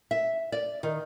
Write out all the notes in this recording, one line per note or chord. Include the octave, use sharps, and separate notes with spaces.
E5
D5
D#3